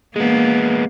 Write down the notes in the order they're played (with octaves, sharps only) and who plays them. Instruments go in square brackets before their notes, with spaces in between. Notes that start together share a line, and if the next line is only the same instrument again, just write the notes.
[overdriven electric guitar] G#3 B3 [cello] A#3